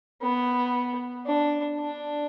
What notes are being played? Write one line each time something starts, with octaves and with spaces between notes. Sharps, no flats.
B3
D4
D4